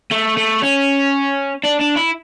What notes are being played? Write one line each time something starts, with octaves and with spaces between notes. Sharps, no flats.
A3
A3
C#4
D4
D4
E4